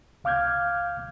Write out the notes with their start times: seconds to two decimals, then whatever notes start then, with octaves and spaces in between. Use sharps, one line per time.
0.24 C#2 F5 D6 F6 G6 G#6